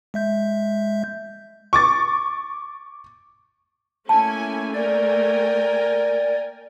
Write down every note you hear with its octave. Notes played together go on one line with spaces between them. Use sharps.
G#3 E5 G6
C#6 D6 A6
A3 A#3 C#4 E4 G#5 A5
A#4 D5 G5 G#5